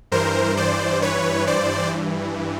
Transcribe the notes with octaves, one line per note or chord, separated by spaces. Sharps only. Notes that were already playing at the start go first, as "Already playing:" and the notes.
G2 E3 A#4 C5
C5 D5
B4 C#5
C5 D5